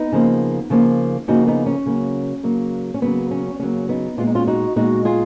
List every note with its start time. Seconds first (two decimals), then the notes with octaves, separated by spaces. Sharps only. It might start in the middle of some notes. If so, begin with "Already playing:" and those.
Already playing: B3 D#4
0.12 C#3 F3 A#3
0.70 C#3 F3 A#3
1.28 C#3 F3 A#3 D#4 F#4
1.47 B3 D#4
1.66 C#4
1.86 C#3 F#3 A#3
2.43 C#3 F#3 A#3
2.94 C#4
3.02 C#3 F#3 A#3 B3
3.31 C#4
3.60 C#3 F#3 A#3 C#4
3.89 B3 D#4
4.18 A#2 G#3 B3 F4
4.27 D#4
4.35 C#4 F4
4.47 D#4 F#4
4.76 A#2 G#3 B3 D#4 F#4
5.05 F4 G#4